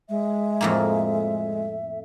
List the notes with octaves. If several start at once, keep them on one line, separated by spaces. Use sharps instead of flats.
G#3 E5
F2 A2 A#3